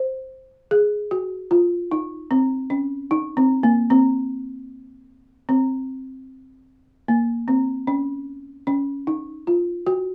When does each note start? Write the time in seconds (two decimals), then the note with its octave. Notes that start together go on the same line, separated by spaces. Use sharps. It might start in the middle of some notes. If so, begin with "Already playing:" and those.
Already playing: C5
0.71 G#4
1.11 F#4
1.51 F4
1.91 D#4
2.31 C4
2.70 C#4
3.11 D#4
3.37 C4
3.63 A#3
3.90 C4
5.49 C4
7.08 A#3
7.48 C4
7.87 C#4
8.67 C#4
9.07 D#4
9.47 F4
9.87 F#4